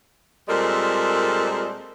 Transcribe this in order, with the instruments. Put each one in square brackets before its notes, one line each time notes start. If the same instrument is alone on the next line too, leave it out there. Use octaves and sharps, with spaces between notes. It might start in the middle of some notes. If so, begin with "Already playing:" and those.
[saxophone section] A#2 G3 G#3 C4 A4 A#4